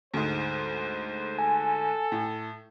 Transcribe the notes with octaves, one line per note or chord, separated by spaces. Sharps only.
D2 G#2 C5
A4 G#5
A2